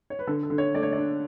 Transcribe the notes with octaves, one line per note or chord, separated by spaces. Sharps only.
C#5
B4
D3 A4
A4
D3
C#5
A3 D5
C#5
D5
D4